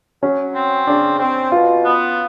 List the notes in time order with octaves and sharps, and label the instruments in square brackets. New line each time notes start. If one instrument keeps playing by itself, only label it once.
[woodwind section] F#3 [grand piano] C#4
[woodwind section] C4
[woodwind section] C#3 [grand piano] D4
[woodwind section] C4
[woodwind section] B2 [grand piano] F4
[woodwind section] B3